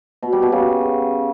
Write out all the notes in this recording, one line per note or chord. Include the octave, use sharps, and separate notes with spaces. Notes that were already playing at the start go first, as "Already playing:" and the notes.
B2
G3
B2
C#3